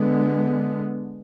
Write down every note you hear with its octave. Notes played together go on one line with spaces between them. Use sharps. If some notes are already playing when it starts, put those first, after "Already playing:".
Already playing: D3 G#3 B3